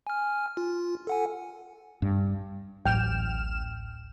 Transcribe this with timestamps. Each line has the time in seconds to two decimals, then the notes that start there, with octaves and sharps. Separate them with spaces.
0.07 G#5 F6
0.57 F4
1.07 A4 F#5 G#5
2.02 G2
2.86 D1 A1 A2 F#3 G5 F6 E7